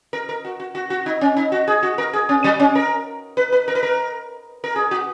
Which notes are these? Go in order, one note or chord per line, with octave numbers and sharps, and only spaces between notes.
A#4
A#4
F#4
F#4
F#4
F#4
D#4
C#4
D#4
F#4
G#4
F#4
A#4
G#4
C#4
F#3
C#4
A#4
B4
B4
A#4
B4
A#4
A#4
G#4
F#4